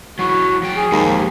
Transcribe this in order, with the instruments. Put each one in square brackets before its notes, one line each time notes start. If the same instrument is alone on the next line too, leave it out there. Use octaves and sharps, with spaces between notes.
[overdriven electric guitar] F#3 E4 [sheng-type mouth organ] F#4
[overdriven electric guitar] F#3 G5
[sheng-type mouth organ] G#4
[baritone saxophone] D#2 [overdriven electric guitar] F3 G#3